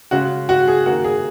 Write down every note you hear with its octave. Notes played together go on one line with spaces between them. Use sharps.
C#3 G#3 F#4
F#4
G#4
D#3 A#3 F#4
G#4